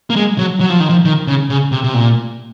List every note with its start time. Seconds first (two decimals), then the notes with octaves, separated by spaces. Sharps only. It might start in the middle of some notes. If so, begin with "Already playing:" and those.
0.10 A#3
0.16 G#3
0.38 F#3
0.60 F#3
0.70 F3
0.80 D#3
0.90 F3
1.05 D#3
1.27 C#3
1.50 C#3
1.72 C3
1.83 C3
1.94 A#2